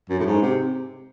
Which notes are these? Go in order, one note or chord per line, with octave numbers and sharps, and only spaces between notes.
F#2
A2
G#2
C3